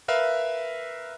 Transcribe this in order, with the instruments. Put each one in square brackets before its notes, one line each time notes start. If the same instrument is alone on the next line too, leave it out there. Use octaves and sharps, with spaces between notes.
[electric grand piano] A#4 B4 E5 F5